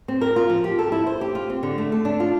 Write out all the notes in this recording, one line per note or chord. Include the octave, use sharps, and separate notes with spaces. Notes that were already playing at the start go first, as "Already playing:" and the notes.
C4
A#4
F4
F3
G4
A4
E4
C5
G4
F4
C4
D3
A3
A4
D4
F4